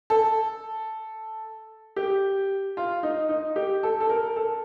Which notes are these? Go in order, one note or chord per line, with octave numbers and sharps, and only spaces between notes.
A4
G4
F4
D#4
D#4
G4
A4
A4
A#4
A4